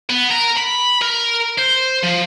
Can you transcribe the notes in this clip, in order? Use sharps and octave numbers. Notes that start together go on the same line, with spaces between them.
B3
A#4
B5
A#4
C5
F3